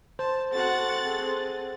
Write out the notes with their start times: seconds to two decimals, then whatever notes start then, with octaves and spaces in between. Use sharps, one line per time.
0.19 C5 A5
0.52 C4 F#4 A4 F#5 F#6 A6
1.05 G#4